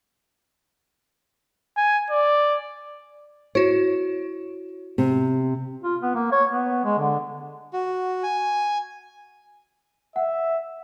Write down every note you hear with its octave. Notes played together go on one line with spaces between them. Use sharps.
G#5
D5
E4 F#4 C#5
C3
F4
B3
A#3
C#5
B3
G#3
D3
F#4
G#5
E5 F#5